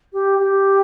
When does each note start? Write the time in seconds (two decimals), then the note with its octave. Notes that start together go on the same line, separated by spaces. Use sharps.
0.13 G4
0.39 G4